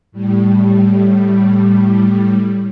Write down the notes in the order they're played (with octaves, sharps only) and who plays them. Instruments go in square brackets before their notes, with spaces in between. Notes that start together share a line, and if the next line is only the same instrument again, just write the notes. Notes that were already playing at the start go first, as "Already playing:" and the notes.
[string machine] A2 G3